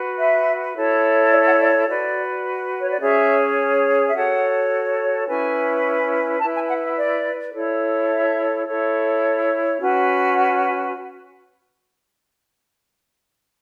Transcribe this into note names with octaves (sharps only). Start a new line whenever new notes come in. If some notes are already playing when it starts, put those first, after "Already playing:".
Already playing: F#4 B4
E5
E4 A4 C#5
D5
F#5
D5
F#4 B4 D5
C#5
D5
C#4 G#4 C#5 E5
E5
F#4 A4 C#5 F#5
C#4 E4 B4 G#5
E4 B4 A5
G#5
F#5
E5
D5
E4 A4 C#5
E5
E4 A4 C#5
C#4 F#4 B4